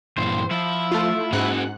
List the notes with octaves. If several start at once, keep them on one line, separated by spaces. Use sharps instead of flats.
G2 A#2 E3 C5
F3 E4
A3 F4
G#2 C#4 F#4 G#4 F#5 F#6